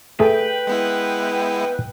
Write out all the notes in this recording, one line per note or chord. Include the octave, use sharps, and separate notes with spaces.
A3 G#4 A4 B4 G5
G#3 B3 E4